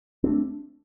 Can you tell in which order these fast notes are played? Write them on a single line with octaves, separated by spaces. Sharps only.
C4 D4 A3